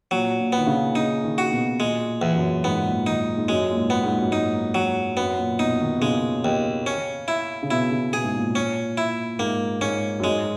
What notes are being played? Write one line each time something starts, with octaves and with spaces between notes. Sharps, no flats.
A#2 F#3
A#2
B3
D#3
C#3
C#3 D#4
D#3
F#4
B2
A#2 G#3
E2
F#2
G#2 B3
A#2
D#3 D#4
G#2
F#2 G#3
A#2
G#2
B3
G#2
F#2
G#2 D#4
F#3
F#2 B3
A#2
B2 D#4
D#3
B2
C#3 G#3
D#2
C#4
E4
C#3
B2 E4
C#3
B2 G#4
G#2
A#2
C#4
E4
G#2 A#3
G#2 C#4
F#2
G#2 G#3